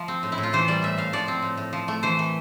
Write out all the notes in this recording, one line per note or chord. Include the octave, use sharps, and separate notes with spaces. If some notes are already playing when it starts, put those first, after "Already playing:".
Already playing: F3 E5
C4
A2
E4
A2
F4
E3 C5
G3 D5
A2 E5
A2 F5
F3 D5
C4
A2
A2
F3
A3
E3 C5
E3